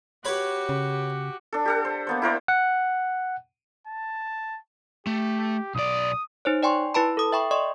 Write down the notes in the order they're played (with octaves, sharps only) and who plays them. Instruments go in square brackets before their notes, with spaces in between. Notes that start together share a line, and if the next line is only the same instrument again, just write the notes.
[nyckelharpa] F#4 G4 [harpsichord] B4 C#5 B5
[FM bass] C#3
[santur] D4 A4
G4 A4 F#5
C5
A#3 B3 C5
E4 A#4 C5 D5
[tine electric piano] F#5
[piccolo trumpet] A5
[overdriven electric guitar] A3 [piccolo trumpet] G4
[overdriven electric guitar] B1 D5 [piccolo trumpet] D#6
[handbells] D#4 C5 C#5
D5 G5 G#5 C6 C#6
E4 B4 A5 B5
A4 D#6
E5 G5 B5 C#6
D5 D#5 C6 C#6 D#6